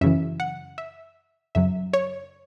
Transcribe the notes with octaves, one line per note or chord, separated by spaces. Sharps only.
F#2 C#3 E3 E5
F#5
E5
F#2 C#3 F#3 E5
C#5